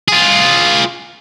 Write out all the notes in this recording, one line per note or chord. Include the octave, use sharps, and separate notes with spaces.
F4 G#4